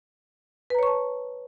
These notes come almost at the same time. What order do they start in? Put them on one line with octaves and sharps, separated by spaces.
B4 A#5 C#5 C#6 A5